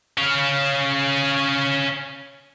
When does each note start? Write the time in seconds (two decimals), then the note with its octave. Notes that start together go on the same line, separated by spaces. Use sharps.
0.18 C#4 F5